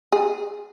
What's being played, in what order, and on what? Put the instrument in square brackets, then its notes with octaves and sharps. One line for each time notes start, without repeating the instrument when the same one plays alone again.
[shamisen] G#4